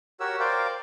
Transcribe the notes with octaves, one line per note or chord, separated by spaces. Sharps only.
F#4 G4 A#4 C#5 F#5 E6
A#4 C5 D5 F5 G5